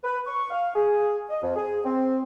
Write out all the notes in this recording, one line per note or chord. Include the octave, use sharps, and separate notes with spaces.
B4
C#6
F5
G#4
D#5
F2
G#4
C4